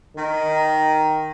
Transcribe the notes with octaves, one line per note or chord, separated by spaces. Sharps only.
D#3